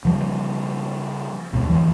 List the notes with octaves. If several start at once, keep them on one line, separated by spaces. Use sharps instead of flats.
C#3 F3 G3
D#2 G#2 B2
F2 C3 D#3 E3